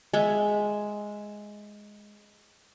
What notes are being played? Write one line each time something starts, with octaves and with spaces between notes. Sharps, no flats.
G#3 E5